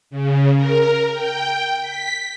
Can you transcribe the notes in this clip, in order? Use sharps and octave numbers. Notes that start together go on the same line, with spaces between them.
C#3
A#4
G5
B6